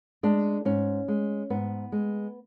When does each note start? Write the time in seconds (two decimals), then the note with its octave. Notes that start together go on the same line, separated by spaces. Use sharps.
0.23 G#3 D4
0.65 G#2 C#4
1.08 G#3
1.50 G#2 B3
1.92 G#3